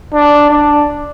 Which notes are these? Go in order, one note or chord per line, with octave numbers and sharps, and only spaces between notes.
D4
D4